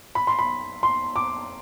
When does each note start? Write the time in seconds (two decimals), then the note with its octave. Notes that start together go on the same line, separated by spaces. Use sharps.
0.15 B5
0.27 C6
0.39 B5
0.83 C6
1.16 D6